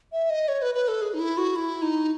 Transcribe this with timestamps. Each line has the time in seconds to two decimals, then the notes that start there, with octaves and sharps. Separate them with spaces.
0.12 E5
0.30 D#5
0.48 C#5
0.62 B4
0.75 B4
0.88 A4
1.02 G#4
1.14 D#4
1.19 E4
1.38 F#4
1.56 E4
1.82 D#4